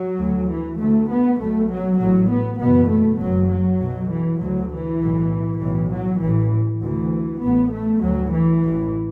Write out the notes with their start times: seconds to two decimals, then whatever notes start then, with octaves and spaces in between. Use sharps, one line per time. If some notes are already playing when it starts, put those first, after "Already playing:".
Already playing: F#3
0.19 D2
0.50 E3
0.79 D2 A3
1.09 B3
1.39 B1 B2 A3
1.70 F#3
1.99 A1 A2 F#3
2.30 B3
2.59 F#1 E2 B2 B3
2.90 A3
3.20 F#1 F#2 F#3
3.51 F#3
3.80 B1 B2
4.11 E3
4.41 D2 F#3
4.71 E3
5.01 B1 A2
5.61 B1 A2 E3
5.92 F#3
6.21 A1 A2 E3
6.82 D2 E3
7.42 A1 A2 B3
7.73 A3
8.02 D2 F#3
8.32 E3
8.63 A1 A2